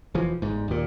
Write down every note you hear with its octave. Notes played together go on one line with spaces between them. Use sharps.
E1 E3 F3
G1 G#2
D#2 A#2